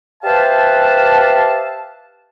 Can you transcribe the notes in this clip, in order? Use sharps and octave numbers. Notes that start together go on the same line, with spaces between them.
G4 B4 C5 E5 F5 A5